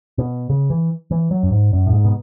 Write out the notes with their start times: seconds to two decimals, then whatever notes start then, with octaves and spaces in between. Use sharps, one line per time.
0.18 B2
0.49 C#3
0.70 E3
1.11 E3
1.31 F#3
1.43 F#2
1.51 G#2
1.73 F#2
1.87 A2
1.93 G#2
2.05 B2